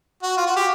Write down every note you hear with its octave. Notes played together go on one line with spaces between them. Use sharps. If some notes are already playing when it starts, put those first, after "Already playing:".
F#4
F4
F#4
G4